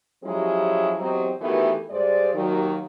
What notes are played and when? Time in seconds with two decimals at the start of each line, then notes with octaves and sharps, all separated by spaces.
0.24 F3 F#3 G#3 C#4 E4 G4
0.99 E2 F#3 C4 G4 D#5
1.41 D#3 E3 A3 B3 F#4 G4
1.90 G2 G#3 C5 D5
2.34 D#2 D#3 F#3